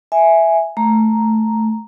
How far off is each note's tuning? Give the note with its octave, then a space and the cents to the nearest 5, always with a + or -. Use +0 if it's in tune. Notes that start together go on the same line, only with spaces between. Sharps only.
E5 +0 G#5 +0
A3 -5 A#5 +0